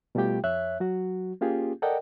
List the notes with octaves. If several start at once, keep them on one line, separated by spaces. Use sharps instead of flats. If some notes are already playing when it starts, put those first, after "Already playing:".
B2 G3 A3 F4 G4 G5
F2 C#5 E5 F#6
F#3 F#4
A#3 C#4 F4 G4 G#4
A4 A#4 D5 D#5 F#5 G5